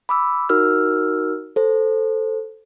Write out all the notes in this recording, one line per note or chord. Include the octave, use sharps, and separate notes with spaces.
B5 D6 E6
D#4 F#4 A#4 E6 F6
A4 C5